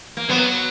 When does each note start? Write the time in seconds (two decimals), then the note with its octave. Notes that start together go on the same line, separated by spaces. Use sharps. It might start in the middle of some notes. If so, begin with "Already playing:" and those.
0.17 A#3
0.29 F#3 B3